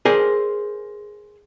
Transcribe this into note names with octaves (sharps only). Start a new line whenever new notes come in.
G#4 A#4 C5 D5 G#5